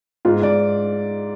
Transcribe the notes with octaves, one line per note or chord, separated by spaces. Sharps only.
G#2 F4
G#2 D5